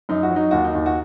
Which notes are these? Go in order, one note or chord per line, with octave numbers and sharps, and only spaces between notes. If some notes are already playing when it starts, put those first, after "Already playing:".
F#2 D#4
F#4
F#3
D#4
D#2 F#4
D#4
D#2
F#4